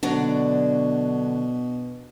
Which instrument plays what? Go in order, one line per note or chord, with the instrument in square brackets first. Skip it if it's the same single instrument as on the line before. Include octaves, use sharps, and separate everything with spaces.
[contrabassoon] B2 [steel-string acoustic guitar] D3 F#3 D5 [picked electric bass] D4